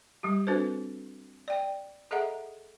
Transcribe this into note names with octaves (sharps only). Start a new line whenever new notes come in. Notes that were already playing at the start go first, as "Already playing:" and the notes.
G3 G4
C4 D4 F#4 A4 B4 C5
D5 G5
G#4 A4 D#5 E5 F#5 A#5